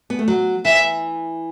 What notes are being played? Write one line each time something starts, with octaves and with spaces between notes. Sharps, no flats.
B3
A3
F#3
E3 E5